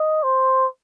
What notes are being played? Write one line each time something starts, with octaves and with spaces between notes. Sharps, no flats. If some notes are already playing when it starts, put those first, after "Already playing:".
Already playing: D#5
C5